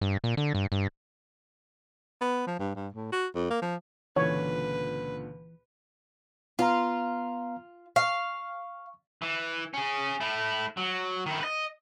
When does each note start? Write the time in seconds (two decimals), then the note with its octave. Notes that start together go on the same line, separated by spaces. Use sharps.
0.01 G2
0.24 A#2
0.37 D3
0.55 G2
0.72 G2
2.21 B3
2.47 F3
2.60 G2
2.75 G2
2.94 A2
3.12 F#4
3.35 F2
3.50 A#3
3.62 F3
4.16 C#2 A#2 D3 E3 B4 C#5
6.59 B3 F4 F5 A#5
7.96 F5 C#6
9.22 E3
9.74 C#4 G#4
10.20 A3 E4
10.77 F#3
11.26 D#3 E4
11.41 B4 D#5